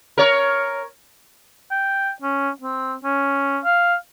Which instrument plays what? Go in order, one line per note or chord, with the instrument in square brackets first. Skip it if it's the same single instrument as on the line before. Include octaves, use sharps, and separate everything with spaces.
[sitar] A#4 C#5
[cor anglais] G5
C#4
C4
C#4
F5